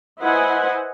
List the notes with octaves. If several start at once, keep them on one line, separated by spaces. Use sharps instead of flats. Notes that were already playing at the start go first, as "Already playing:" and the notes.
E4 B4 C5 D#5 F#5 G#5